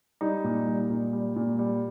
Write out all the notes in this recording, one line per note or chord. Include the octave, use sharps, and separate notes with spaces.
G3 D#4
A#2
G3
A#2
G3
A#2
G3